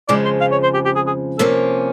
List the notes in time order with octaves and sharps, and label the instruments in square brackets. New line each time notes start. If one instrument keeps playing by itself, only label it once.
[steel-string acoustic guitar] F2 C#3 F3 G#3 [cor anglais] D5
[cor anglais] C5
F5
C#5
C5
G4
G4
G#4
G#4
[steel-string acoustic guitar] C3 F3 A#3 C#4 [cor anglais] A4